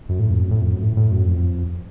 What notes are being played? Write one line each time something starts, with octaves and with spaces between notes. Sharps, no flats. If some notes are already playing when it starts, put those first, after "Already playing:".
F#2
A2
F2
F#2
A2
F2
F#2
A2
A2
F#2
F2